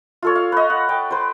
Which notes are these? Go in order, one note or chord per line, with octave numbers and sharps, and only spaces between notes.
F4 A4 C#5
F5
B4 D#5
F#5
G5 A5
B4 C5